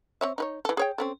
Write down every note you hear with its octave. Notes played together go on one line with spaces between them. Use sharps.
C4 C#5 E5
D#4 B4 C#5
E3 A4
G#4 C#5 G5
C4 C#4 A4